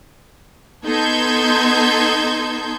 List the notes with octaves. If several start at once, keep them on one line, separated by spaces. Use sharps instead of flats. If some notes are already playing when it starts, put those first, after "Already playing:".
B3 D#4 A4 C6 G6 G#6